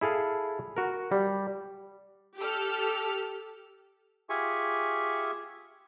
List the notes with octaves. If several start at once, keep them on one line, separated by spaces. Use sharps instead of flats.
E4 G#4 A4 F5
F#4 A#4
G3
G4 A4 F6
F4 G4 G#4 E5 G#5 C#6